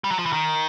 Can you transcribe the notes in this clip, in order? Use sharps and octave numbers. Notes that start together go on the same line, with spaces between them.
G3
F#3
F3
E3
D#3